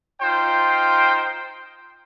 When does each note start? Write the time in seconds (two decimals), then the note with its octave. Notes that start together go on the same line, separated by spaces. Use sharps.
0.21 D#4 F4 C5 G5 C6